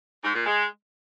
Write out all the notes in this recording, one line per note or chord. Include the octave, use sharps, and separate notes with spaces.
G#2
A#2
G#3